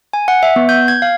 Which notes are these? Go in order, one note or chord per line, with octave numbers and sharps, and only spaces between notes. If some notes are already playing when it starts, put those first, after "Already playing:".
G#5
F#5
E5
B3
G6
G#6
F5